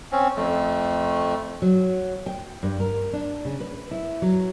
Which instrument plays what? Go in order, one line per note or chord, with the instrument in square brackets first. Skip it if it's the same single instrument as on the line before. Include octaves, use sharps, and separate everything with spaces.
[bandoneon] C4 C#4
F2 A3
[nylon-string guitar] F#3
G5
G2
A#4
D4
C#3
B4
E4
F#3